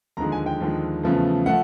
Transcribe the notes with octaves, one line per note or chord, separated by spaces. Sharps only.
D#2 D3 F3 G#3 A#5
G#5
G5
D#2 D3 F3 G#3
E2 C#3 F3 A3
F3 A3 F#5